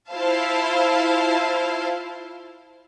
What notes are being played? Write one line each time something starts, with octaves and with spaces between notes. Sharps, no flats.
E4 F4 C5 F5 A5